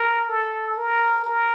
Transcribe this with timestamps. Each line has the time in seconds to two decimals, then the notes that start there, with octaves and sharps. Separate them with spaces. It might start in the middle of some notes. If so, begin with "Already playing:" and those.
Already playing: A#4
0.29 A4
0.77 A#4
1.25 A#4